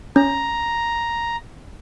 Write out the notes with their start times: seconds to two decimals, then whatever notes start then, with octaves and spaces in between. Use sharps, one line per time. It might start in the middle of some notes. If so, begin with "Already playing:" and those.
0.16 C#4 A#5